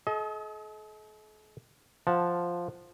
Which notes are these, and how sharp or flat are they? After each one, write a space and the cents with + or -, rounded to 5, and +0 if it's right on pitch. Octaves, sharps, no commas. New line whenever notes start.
A4 -45 D#5 +30
F3 +0 F#5 +0 A5 +0